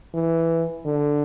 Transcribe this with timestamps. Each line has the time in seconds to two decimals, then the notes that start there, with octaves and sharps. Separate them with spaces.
0.14 E3
0.85 D3